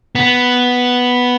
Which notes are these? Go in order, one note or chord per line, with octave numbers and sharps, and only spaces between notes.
B3